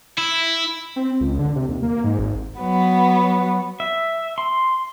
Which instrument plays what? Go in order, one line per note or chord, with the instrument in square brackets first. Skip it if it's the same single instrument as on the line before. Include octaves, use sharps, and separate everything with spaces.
[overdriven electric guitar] E4
[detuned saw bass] C4
C#2
D3
C3
D#2
A#3
G#2
G#1
[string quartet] F#3 B3
[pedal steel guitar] E5
C6